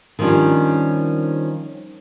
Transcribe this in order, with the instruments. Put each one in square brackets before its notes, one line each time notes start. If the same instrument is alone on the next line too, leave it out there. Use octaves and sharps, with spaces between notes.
[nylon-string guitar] D#3 F3 G3 C#4 D4